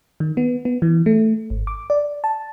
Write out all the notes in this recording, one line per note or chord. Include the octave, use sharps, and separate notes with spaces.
D#3
B3
B3
E3
A3
G#1
D6
D5
A5